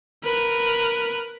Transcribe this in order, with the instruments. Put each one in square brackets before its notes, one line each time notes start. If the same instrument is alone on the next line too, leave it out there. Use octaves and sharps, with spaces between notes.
[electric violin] A#4 B4